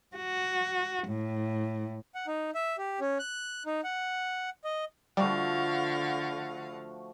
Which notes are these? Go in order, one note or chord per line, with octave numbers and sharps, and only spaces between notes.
F#4
A2
F#5
D#4
E5
G4
C#4
F#6
D#4
F#5
D#5
D3 F3 G3 A3 F#4 F5 F#5